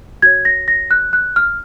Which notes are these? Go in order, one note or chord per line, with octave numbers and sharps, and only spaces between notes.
F#4 C#5 G#6
A#6
A#6
F#6
F#6
F6